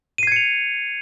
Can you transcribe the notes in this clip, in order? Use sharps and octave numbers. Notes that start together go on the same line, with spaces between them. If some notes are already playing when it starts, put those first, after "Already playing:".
G#6 C7 C#7 D#7 F7